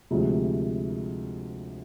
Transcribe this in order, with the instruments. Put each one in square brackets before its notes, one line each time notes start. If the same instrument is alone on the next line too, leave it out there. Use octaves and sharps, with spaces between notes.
[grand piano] D2 C3 F3 G#3